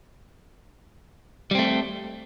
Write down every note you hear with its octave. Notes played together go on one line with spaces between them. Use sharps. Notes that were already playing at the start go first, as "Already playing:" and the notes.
G3 A3 C4